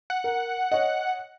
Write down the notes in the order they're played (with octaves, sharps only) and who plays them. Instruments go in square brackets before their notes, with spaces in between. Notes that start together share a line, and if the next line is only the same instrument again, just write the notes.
[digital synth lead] F#5
[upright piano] A#4
[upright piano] C#5 D#5 [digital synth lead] F#5